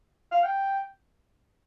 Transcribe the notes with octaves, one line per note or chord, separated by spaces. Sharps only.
F5
G5